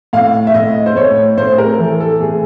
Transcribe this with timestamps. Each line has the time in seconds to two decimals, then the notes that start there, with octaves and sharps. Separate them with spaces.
0.13 A2 F5
0.47 E5
0.54 A2 D#5
0.86 C5
0.96 A2 C#5
1.37 A2 C5
1.58 A#4
1.79 E3 A4
2.00 A4
2.20 A2 G#4